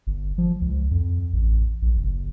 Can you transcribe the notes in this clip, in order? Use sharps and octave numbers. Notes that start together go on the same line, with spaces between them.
G1
F3
C#2
F2
A1
A#1
F#1